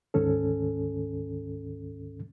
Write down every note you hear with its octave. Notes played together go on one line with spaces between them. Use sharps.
D2 G#2 D#3 C#4 A4